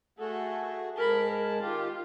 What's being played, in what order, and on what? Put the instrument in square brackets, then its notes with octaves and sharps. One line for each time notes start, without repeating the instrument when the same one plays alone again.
[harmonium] A3 F#4 G#4 [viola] A4
[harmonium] G#2 G#4 A5 [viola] A#4 B5
[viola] A#4
[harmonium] D#3 G4 [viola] F4